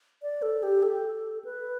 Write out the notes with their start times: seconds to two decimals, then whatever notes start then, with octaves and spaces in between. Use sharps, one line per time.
0.22 D5
0.42 A4
0.63 G4
0.83 A4
1.45 B4